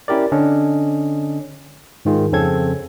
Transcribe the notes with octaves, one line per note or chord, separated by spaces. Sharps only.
C#4 E4 G4 A#4 D5
D3 C#4 D4 D#5
G#2 D#3 F4 G#4
F2 C#3 C4 C#4 A4 G#6